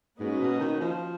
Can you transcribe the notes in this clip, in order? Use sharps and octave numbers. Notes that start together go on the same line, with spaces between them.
G#2 A#3 C#4 F#4 B4 D#5
B2
D#3
F3